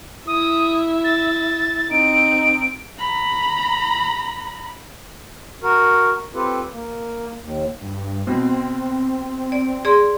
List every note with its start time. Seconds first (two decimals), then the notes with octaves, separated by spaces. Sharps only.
0.27 E4 E5 D#6
1.04 A6
1.91 C4 D#4 D7
2.99 A#5 B5
5.63 F#4 A#4
6.35 C4 F4 G4 A4 B4
6.72 A#3
7.39 D#2
7.81 G2
8.27 B2 C4
9.52 D5
9.85 G#4 D5 C6